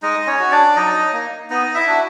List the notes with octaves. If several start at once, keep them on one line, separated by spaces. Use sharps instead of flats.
G#3 D#4 D#5
C#4 C#5
C#4 F#4
D4 D5
F#3 D#4 D#5
A#3 D#4
B3 D#4 D#5
E4 E5
D4 F#4